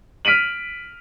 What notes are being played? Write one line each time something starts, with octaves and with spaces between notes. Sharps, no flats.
F6 B6 D7 D#7 F#7